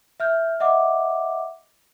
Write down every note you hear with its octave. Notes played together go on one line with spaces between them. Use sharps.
E5 F6 G6
D#5 E5 F#5 D6